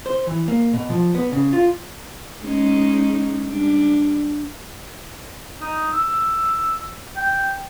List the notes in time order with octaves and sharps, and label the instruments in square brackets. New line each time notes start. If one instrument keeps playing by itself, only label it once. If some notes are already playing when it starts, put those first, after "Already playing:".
[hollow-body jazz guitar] C5
E3
A#3
B2
F3
B3
C#3
F4
[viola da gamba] G#3 C#4 D#4
G3 D4
[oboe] D#4
E6
G5